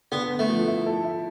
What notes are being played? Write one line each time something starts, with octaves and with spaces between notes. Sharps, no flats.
D3 B3
B3
A3
F3
E4
A4
E4